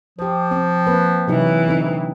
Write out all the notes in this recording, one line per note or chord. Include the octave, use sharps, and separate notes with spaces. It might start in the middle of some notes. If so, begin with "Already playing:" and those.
F3 G4 C5
C4
A#3 C4 B4
C3 E3 F#3 D#4
D3 C4 D#4